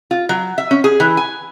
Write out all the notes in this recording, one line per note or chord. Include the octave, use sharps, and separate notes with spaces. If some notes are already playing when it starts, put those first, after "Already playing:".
F4
F#3
E5
C#4
G#4
E3
G#5